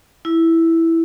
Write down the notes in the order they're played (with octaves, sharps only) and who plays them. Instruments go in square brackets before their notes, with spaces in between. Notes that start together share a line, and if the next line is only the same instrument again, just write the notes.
[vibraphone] E4